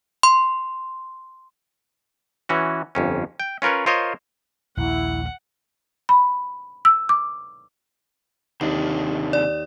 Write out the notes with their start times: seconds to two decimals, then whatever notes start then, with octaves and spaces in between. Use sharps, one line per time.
0.23 C6
2.49 E3 C#4 F#4
2.95 G1 F2 C#4
3.40 G5
3.62 C#4 F4 A#4 B4 C#5
3.86 F4 A#4 C5 C#5 D#5
4.78 A#1 D#2 E4 F#5
6.09 B5
6.85 E6
7.09 D6
8.61 D#2 C3 D#3 D4
9.33 D5